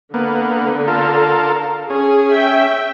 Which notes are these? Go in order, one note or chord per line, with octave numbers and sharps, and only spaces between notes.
D3 A#3 B3
F4 A4 A#4
C#4 G#4
E5 G5